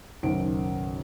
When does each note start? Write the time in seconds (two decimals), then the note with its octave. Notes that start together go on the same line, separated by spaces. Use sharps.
0.23 F#1 B1 D#3 C5 D7